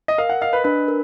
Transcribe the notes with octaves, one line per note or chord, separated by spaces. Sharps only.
D#5
A#4 F5
F#5
D#5 F5
B4
D4 B4
A#4